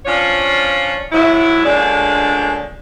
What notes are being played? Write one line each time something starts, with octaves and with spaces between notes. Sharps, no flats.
F3 C#4 D4 F4 C#5
G#2 D#3 F#3 E4
A#2 D3 G#3 C#4 D4 D5